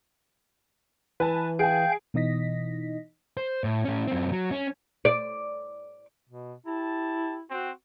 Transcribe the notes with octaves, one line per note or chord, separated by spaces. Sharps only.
E3 B4 G#5 A5
G#4 F5 G5 G#5 G6
B2 E3 D#4 D#5 A#6 B6
C5
A2
A2 C#4
F#2 C4
F#3
C#4
D5
B2
E4 G4 A5
C4 F#4